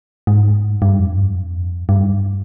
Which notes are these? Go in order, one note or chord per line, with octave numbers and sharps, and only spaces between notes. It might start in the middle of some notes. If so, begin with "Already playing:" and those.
G#2
G2
F2
G2
F2
G2